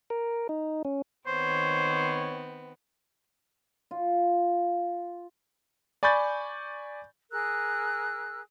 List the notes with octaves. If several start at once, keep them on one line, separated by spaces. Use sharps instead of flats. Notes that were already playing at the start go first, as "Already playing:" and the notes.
A#4
D#4
C#4
D#3 B3 C4 C5 C#5
F4
D5 G#5 B5 C#6 G6 A6
G#4 A#4 E6 F#6